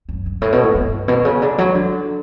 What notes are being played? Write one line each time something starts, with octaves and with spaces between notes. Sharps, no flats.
F#2
G2
A2
B2
A2
G2
B2
C#3
D3
F#3
D3